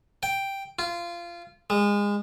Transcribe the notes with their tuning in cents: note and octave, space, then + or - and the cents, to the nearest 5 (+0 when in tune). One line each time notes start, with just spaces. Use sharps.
G5 +0
F4 -20
G#3 -25